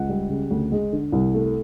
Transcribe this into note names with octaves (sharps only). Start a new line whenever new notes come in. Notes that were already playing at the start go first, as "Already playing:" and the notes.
Already playing: C#2 F#5
G3
C#3
D2
G#3
D3
C2
A3